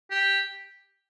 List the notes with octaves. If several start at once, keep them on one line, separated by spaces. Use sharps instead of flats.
G4